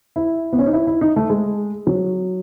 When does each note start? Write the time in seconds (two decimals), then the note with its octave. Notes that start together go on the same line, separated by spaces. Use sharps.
0.16 E4
0.53 B3
0.59 C#4
0.66 D#4
0.73 E4
0.87 E4
1.01 D#4
1.16 A3
1.30 G#3
1.87 F#3